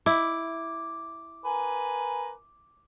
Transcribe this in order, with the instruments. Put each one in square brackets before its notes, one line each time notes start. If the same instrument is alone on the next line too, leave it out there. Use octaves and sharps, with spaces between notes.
[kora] E4 [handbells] D6
[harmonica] A#4 B4 G#5